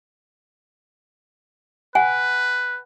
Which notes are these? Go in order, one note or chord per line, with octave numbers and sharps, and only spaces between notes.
B4 F#5 G#5